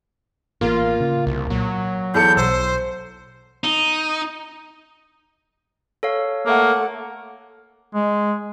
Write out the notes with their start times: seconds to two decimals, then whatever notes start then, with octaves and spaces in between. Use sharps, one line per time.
0.61 A1 A#3 F4
1.00 C#3
1.27 C2
1.50 A#2 F#3
2.14 E2 A4 G6 C#7
2.37 B1 C5 E6
3.64 D#4
6.03 A4 C#5 F5
6.46 A3 A#3 F#5
7.95 G#3